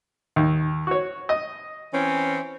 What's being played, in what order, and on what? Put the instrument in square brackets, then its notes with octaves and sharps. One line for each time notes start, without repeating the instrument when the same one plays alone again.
[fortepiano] D#2
F#4 C#5
D#5
[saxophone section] E3 C4 C#4